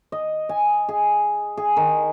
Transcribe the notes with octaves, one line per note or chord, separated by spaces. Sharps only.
D#5
G#5
G#4
G#4
D#3